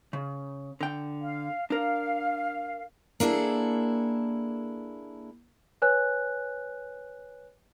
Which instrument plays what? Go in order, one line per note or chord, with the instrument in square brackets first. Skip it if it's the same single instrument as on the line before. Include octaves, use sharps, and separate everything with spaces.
[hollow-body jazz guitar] C#3
D3 G5
[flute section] F5
[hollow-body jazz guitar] D4 A#4 [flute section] F5
[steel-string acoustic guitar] A#3 D4 E4 G#4 A4
[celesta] B4 C#5 G#5 F#6